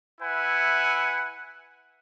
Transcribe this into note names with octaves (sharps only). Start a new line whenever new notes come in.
E4 B4 E5 F#5 G#5